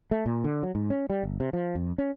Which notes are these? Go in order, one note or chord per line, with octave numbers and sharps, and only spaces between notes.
A3
A#2
D3
F#3
G#2
C#4
G3
G1
C3
F3
F2
C#4